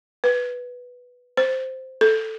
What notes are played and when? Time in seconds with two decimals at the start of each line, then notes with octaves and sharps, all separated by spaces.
0.24 B4
1.37 C5
2.01 A4